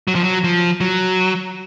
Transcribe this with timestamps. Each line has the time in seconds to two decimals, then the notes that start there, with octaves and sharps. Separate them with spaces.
0.08 F#3
0.15 F3
0.24 F#3
0.44 F3
0.80 F#3